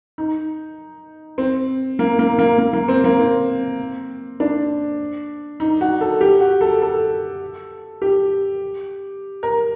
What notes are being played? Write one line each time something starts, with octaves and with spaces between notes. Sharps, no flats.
D#4
C4
A#3
A#3
A#3
A#3
A#3
C4
A#3
C4
D4
D#4
F#4
A4
G4
F#4
A4
A4
G4
A#4